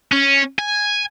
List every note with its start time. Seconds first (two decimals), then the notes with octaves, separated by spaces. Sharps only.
0.12 C#4
0.59 G#5